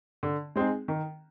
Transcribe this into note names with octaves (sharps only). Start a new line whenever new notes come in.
D3
G#3 C4 D#4 G#4
D#3